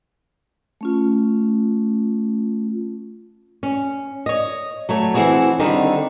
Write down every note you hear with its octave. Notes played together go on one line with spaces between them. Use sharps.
A3 C#4 F4
C#4
C#5 D#5
F#3 A3 C#5
E3 C4 E4 F#4 G#4 C#5
D3 D#3 G3 C4 D#4